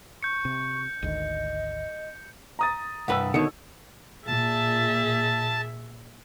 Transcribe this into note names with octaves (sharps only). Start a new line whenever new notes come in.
C#6 G6 C#7
C3
G#1 D2 D#3 D#5
A#5 D#6 A6
C2 G2 B4 F#5 E6
B2 D3 D#3 D#4 C#5 C#7
A#2 G#4 E5 A5